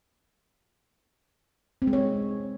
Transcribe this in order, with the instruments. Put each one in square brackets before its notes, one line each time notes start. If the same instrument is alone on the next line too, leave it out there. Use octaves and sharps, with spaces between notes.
[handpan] C4
G#3
C#5